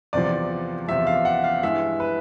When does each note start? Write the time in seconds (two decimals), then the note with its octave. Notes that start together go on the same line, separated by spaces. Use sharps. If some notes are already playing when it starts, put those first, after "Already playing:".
0.13 E2 C3 F3 D5
0.88 E2 C3 F3 E5
1.07 F5
1.25 F#5
1.44 F5
1.63 G2 E3 G#3 E5
2.00 B4